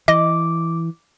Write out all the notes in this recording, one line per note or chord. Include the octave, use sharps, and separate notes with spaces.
E3 D#5 D6